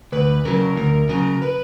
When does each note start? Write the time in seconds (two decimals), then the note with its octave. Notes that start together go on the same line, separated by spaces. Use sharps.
0.12 D2 B4
0.45 C#3 F#3 A#4
0.76 D2 A#4
1.09 C#3 F#3 A#4
1.42 B4